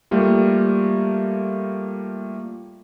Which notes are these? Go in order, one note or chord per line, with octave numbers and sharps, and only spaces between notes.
G3 A3 A#3 F4